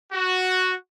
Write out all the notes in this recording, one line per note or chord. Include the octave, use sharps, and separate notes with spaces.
F#4